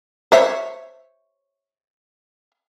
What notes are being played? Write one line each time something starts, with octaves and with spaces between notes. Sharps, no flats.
C5 C#5 E5